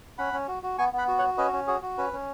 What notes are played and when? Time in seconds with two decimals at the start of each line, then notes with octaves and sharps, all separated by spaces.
0.18 C#4 F#5 B5
0.33 C#4
0.48 F#4
0.63 F#4
0.78 B3 G#5 C#6
0.93 B3
0.98 F#5 B5
1.08 F#4
1.18 C#5 F#5
1.23 F#4
1.38 C#4 B4 D#5
1.53 C#4
1.67 F#4 G#4 C#5
1.82 F#4
1.98 C#4 B4
2.13 C#4